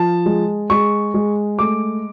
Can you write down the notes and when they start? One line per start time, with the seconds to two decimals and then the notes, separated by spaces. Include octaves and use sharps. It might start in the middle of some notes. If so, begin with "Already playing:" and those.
Already playing: F3 A5
0.26 G#3
0.70 G#3 C#6
1.14 G#3
1.59 A3 D6